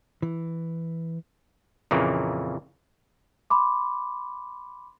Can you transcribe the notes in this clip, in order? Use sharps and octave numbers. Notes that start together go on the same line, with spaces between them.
E3
F2 A#2 C#3 E3 A#3
B5 C6 D6